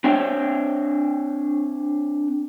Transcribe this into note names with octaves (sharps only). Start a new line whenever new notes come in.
C4 D4 C#5 E5 G5